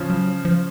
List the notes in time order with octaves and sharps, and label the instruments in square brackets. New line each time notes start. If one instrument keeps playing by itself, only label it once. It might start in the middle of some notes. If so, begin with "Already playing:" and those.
Already playing: [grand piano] C#3 F3
[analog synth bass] F#3
F3